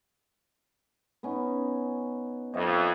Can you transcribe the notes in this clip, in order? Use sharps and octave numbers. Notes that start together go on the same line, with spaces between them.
B3 C#4 D#4
F2 D#5 E5 G5